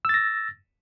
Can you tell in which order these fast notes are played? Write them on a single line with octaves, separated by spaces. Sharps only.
E6 A6 A#6